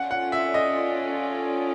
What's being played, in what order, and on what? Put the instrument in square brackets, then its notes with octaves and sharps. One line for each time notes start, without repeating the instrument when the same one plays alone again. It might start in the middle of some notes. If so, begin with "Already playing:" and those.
Already playing: [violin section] C#4 F4 A4 D5 [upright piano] F#5
[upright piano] F#5
E5
D#5